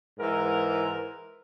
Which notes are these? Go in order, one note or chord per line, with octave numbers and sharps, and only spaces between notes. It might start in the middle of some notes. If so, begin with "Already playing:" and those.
G#2 E3 A#4